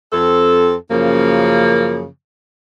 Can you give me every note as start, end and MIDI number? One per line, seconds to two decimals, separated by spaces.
0.12 0.74 41
0.12 0.74 60
0.12 0.74 69
0.90 2.05 42
0.90 2.05 49
0.90 2.05 53
0.90 2.05 58